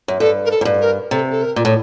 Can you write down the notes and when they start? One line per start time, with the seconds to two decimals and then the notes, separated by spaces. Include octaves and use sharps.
0.08 F#2
0.20 G2 A4
0.45 A#4
0.50 A4
0.61 G#2
0.65 G2
0.81 A#4
1.11 C3 A4
1.31 A4
1.42 A#4
1.56 A#2
1.65 A2